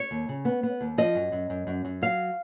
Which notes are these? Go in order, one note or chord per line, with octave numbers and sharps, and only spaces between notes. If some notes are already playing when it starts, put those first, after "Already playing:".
Already playing: C#5
D#2
C#3
B3
B3
D#2
F3 D#5
F#2
F#2
F#2
F#2
F#2
F#3 F5